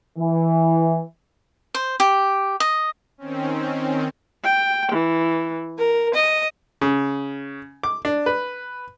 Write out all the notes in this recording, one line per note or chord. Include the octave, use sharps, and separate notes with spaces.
E3
C5
G4
D#5
D#3 C4 C#4
G5
E3
A#4
D#5
C#3
D6
D4
B4